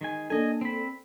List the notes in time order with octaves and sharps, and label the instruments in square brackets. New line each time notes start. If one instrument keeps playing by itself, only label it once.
[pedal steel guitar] D#3 G#3 G#5
[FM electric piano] A#3 D4 A4 [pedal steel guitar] D#5 G#5
[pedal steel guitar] C4 B5